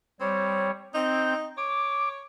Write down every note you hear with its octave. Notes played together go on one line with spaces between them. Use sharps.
G3 C4 C#5
C4 D#4 G6
C#5 D6